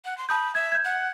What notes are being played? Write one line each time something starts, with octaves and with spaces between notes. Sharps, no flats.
F#5
C6
A5 B5 D#6 G6
E5 G#6
G6 G#6
F#5